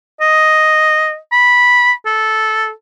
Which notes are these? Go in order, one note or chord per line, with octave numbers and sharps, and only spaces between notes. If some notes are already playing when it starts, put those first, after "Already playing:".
D#5
B5
A4